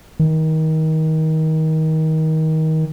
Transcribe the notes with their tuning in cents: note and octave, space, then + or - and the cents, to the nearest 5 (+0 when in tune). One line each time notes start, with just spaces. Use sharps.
D#3 +25